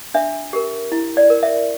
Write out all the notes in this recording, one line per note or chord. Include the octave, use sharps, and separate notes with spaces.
D4 E5
G4 A#4
E4
D5
A#4
E5